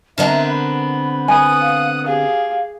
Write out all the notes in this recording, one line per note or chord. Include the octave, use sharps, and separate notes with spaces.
D3 B3 C4 A#4 D#5 E5 A#5
B5
B4 F#5 G#5 D#6
F5
G4 G#4 F5